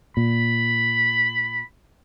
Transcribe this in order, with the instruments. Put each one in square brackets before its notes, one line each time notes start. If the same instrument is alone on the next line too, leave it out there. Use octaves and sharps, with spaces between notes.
[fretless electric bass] A#2 [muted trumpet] B5